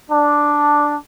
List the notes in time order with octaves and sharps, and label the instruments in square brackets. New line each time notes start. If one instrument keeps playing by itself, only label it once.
[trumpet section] D4